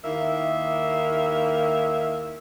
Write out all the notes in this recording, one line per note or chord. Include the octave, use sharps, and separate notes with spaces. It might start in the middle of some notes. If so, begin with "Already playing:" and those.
D#2 D#3 A#3 E4 E5